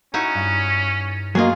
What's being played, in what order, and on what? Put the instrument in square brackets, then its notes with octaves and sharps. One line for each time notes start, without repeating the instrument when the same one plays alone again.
[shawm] C#4 [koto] D#4 E4 F#4
[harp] G2 F#6 C#7
A6
[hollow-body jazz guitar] F#3 A#3 D#5 [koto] F4 G#4